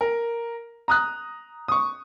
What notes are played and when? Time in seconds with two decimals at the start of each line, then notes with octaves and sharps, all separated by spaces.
0.01 A#4
0.88 A#5 D#6 F#6
1.68 C#6 D#6